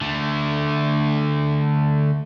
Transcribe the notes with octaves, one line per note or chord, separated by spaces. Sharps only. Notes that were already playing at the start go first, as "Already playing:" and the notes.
D3 A3